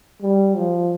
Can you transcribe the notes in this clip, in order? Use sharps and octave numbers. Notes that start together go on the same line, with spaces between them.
G3
F3